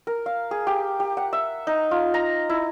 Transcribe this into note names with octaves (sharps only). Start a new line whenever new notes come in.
A#4
F5
G#4
G4
G4
F#5
E5
D#4
F4
A#5
E4